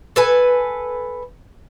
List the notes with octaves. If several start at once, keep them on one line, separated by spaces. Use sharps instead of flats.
A4 B4 G#5